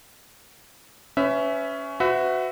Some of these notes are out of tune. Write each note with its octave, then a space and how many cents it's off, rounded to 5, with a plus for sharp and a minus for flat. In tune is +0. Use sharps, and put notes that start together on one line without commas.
C#4 +10 B4 +40 E5 +0
F#4 +0 B4 +40 E5 +0